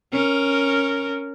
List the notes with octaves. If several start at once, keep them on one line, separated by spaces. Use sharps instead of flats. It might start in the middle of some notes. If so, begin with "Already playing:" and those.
C#4 A#4